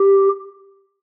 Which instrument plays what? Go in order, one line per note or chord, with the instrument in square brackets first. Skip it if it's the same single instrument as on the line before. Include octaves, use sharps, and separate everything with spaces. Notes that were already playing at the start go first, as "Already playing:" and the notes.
Already playing: [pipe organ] G4